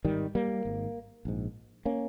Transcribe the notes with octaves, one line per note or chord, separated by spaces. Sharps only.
G#1 G#2 D#3 G3
G3 A#3
G#1 G#2
A#1 G#2
A#3 C#4